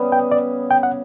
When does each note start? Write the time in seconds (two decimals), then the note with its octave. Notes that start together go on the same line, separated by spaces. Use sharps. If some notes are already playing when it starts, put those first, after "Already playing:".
Already playing: C#3 G3 B3
0.12 G5
0.32 D5
0.71 G5
0.83 F#5